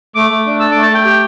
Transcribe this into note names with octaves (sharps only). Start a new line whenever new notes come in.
A3 D6
A3
D4
A4 E6
A3 D6
A5
A3 G5
G4